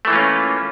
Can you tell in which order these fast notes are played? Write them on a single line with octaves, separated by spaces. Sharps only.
A3 E3 A#3 F4 C#4